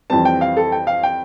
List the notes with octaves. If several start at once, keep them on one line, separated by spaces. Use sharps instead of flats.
F2 E3 G3 C4 A5
G5
F5
A4
G5
F5
G5